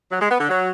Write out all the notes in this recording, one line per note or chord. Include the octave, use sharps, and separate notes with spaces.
F#3
G#3
B3
D3
F#3